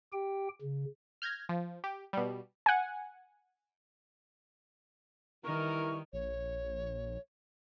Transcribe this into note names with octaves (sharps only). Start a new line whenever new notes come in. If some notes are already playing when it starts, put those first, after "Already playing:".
G4 G5
C#3
F6 G6 G#6 A#6
F3
G4
B2 G3
F#5 G#5
D#3 E3 G3 E4 A#4 C#6
A#1 C#5